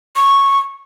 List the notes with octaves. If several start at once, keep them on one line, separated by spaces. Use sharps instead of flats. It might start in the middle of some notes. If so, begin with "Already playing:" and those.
C#6